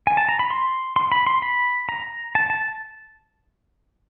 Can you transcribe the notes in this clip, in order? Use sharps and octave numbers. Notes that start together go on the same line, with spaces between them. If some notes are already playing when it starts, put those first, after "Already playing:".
G#5
A5
A#5
B5
C6
C6
B5
C6
B5
A#5
A5
A5